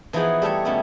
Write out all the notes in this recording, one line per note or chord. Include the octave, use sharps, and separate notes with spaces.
E3 F3 B3 D#4 G#4 F#5
G3 A3 A4 C#5
B2 G3 A3 B3 C#4 E4